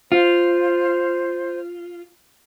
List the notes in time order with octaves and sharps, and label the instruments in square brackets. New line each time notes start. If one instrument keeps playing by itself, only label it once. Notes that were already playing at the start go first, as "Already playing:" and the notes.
[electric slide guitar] F4 [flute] C5